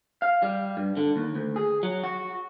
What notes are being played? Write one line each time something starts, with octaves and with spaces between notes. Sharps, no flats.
F5
G3
G2
D3
D#2
D2
G#4
F#3
F#4